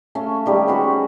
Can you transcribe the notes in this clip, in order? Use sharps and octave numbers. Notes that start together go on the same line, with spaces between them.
A3 C#4 F5
D#3 G3 G#3
C#4 F#4 B4 C5